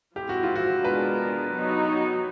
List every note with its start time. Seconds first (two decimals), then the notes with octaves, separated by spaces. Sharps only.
0.15 F3 G#3 C4 E4 G4
0.29 F#4
0.43 F4
0.56 F#4
0.85 G#3 B3 D4 F4 A#4 B4
1.54 F#3 B3 D#4 F#4